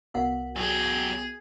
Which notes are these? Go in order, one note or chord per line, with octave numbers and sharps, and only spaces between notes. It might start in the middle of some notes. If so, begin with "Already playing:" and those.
C2 B3 F#4 A#4 F5 F#5
F#3 G4 G#4